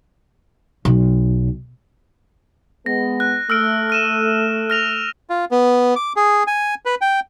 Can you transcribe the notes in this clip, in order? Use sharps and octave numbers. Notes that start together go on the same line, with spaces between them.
B1
G#3 B3 A#6
F#6
A3 E6 F6 D7
F6 D#7 E7
F6 A#6 F7
F4
B3
D6
G#4
G#5
B4
G5